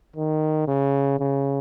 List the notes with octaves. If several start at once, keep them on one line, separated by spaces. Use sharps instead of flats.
D#3
C#3
C#3